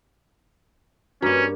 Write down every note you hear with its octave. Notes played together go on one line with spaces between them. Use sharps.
G2 A#3 C#4 F#4 A#5